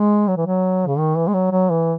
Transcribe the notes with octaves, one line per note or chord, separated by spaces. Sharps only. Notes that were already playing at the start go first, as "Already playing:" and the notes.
Already playing: G#3
F#3
E3
F#3
C#3
D#3
E3
G#3
F#3
F#3
E3